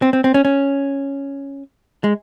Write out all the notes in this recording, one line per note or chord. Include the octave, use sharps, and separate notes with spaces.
C4
C4
C4
C#4
C#4
G#3